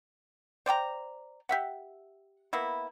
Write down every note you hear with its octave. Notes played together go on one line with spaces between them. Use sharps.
C5 D5 G5 A#5
G4 E5 F#5
A#3 B3 E4